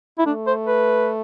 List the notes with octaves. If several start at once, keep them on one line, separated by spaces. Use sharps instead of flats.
E4
A3 D4
C5
B4